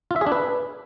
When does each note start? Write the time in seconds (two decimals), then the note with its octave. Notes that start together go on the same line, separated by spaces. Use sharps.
0.11 F4
0.16 E5
0.21 G#4
0.26 D4
0.32 B4